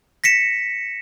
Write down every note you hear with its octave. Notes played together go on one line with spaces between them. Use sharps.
A#6 B6 C#7 E7